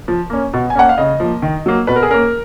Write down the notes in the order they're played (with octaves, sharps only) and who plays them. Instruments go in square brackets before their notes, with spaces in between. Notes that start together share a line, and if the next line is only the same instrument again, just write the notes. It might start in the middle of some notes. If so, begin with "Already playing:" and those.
[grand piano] F3
A#3 C#4
B2
G#5
A#3 C#4 F#5
F5
C#3 D#5
F3 A#3
D#3
F#3 A#3
B2 B4
A#4
G#4
A#3 C#4 A#4